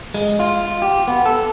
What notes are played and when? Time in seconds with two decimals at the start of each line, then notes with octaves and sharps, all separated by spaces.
0.14 G#3
0.40 F4
0.82 G4
1.08 B3
1.26 A4